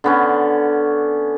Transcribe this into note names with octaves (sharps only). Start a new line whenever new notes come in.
D3 B3 C#4